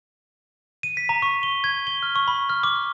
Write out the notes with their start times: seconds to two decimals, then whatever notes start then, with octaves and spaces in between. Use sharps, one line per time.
0.83 D#7
0.97 B6
1.09 A#5
1.22 C#6
1.43 G7
1.64 G#6
1.87 G7
2.03 F6
2.16 C#6
2.28 B5
2.49 F6
2.63 D6